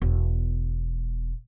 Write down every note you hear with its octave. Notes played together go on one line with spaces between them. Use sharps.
E1 B3